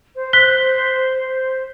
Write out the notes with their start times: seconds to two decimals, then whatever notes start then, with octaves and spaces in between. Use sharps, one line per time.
0.15 C5
0.33 F#6 B6 G7